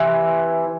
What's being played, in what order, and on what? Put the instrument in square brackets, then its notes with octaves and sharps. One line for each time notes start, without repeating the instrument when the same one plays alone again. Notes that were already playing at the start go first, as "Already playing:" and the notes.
Already playing: [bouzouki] C3 E3